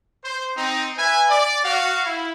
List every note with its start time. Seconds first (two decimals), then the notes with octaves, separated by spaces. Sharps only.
0.22 C5
0.56 C4 D#4
0.96 B4 E5 G#5
1.29 D5
1.64 F#4 F5
2.04 E4